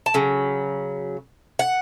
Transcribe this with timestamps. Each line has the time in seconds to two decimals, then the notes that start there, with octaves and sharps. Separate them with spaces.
0.06 A5
0.14 C#3 F#3
1.59 F#5